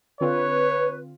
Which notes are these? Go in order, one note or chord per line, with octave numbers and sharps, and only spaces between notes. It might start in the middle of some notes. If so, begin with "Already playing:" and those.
D3 C4 F4 B4 C#5